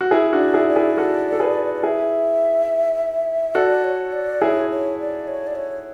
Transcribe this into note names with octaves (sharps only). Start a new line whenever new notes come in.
F#4
E4 G#4
D4 F#4
D5
E4 G#4
D5
E4 G#4
F#4 A4
A4
G#4 B4
D5
E4 G#4 E5
F#4 A4 D5
C#5
D5
E4 G#4 C#5
C#5
D5
C#5
D5
C#5